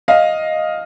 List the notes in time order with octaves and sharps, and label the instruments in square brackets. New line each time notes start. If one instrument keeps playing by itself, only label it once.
[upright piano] D#5 F5